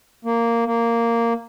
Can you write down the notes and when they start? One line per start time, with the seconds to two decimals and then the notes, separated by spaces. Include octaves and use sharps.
0.25 A#3
0.66 A#3